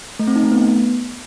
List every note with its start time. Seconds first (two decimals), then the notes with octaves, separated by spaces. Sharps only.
0.19 A3
0.27 C4
0.36 D#4
0.44 A3
0.52 B3